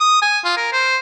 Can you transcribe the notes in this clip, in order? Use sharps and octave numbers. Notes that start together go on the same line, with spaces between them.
D#6
G#5
F4
A#4
C5